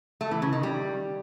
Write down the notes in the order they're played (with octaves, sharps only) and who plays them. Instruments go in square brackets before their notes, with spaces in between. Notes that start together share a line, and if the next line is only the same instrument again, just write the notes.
[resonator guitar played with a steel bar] A3
E3
C#3
D#3
G3